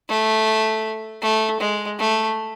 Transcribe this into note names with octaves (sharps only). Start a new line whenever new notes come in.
A3
A3
G#3
A3